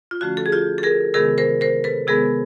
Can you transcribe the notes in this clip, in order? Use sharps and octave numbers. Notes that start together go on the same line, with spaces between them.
F4
D3 F3 A3 C#4 F#4
A4
G#4
F4 G4
A4
G#4 A#4
C3 D#3 G#3 B3 G#4 A#4
A#4 C5
A#4 C5
A4 B4
C3 D#3 G#3 B3 G#4 A#4